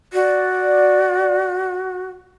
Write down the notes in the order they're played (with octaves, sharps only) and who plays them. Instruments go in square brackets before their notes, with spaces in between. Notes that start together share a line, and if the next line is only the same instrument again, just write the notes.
[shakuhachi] F#4 [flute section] D5